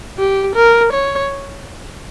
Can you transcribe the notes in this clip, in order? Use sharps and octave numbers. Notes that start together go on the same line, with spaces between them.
G4
A#4
C#5